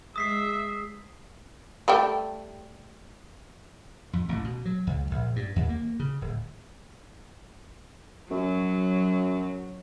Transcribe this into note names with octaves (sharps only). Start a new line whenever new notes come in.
G#3 E5 D#6 B6 C7
G3 A3 G5
F2
A1
B2
F#3
C#2
A#1
G2
D#2
A#3
C#3
D1
F#2 F#3